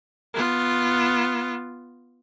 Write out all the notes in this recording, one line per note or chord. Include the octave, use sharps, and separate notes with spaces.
B3 F4